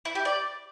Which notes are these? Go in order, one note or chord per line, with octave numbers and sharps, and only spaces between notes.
E4
G4
D5